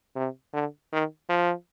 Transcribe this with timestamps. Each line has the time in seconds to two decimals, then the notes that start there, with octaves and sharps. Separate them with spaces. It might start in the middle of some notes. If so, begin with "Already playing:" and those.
0.16 C3
0.54 D3
0.92 D#3
1.29 F3